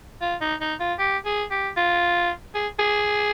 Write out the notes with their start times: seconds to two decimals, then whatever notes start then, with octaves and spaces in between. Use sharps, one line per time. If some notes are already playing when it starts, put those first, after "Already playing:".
0.22 F4
0.41 D#4
0.61 D#4
0.80 F4
0.99 G4
1.26 G#4
1.51 G4
1.77 F4
2.55 G#4
2.80 G#4